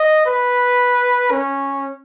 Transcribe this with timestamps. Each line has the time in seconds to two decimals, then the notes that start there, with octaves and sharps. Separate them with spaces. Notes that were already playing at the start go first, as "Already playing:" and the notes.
Already playing: D#5
0.25 B4
1.31 C#4